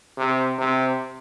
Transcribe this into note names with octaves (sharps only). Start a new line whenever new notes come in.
C3
C3